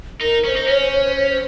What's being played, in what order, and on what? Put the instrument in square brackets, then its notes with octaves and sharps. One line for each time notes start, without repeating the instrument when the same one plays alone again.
[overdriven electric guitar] D#4 [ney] A#4
[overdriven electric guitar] C#4 [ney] C5
[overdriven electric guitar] D#4
[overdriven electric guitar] C#4 [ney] C#5
[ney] C5
C#5
C5
C#5
C5